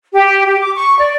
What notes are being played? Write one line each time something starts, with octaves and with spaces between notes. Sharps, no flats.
G4
G4
D6
C#6
D5